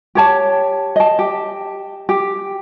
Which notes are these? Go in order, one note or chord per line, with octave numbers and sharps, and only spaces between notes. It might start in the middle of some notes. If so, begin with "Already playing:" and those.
G4 C#5 A5
D#5 A5
G4
G4